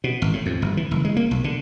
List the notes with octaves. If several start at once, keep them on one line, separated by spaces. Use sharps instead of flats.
B2
G#1
A2
F2
G1
E3
F#1
G#3
A#3
B1
D3